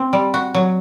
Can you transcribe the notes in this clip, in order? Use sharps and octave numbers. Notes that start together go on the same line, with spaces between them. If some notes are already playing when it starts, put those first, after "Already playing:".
Already playing: C4
G3
F#4
F#3